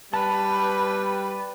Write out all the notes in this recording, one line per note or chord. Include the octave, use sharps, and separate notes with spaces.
G3 B4 A5